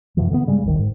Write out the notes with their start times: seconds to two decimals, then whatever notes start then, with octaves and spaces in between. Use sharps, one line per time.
0.17 F#2 B2 E3 F3
0.30 D3 E3 G3 B3
0.46 G2 C#3 G3 G#3
0.64 D1 G#1 D#3
0.79 G#2